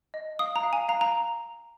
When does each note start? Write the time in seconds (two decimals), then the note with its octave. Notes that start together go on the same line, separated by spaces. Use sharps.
0.14 D#5
0.39 F5 D#6
0.56 A#5
0.63 F5
0.73 G#5
0.89 F5 A#5
1.01 A#5